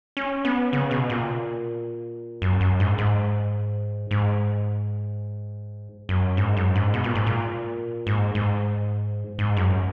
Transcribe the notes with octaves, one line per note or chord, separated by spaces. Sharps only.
C#4
B3
C#3
B2
A#2
F#2
F#2
G#2
G#2
G#2
F#2
G#2
F#2
G#2
B2
A#2
G#2
A#2
G#2
G#2
G#2
F#2